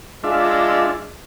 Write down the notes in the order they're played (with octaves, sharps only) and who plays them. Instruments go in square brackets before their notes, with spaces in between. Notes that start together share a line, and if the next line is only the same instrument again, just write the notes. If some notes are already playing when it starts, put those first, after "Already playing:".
[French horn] G#3 [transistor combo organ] D4 F4 E5